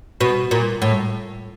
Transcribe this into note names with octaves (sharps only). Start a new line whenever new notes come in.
B2
A#2
A2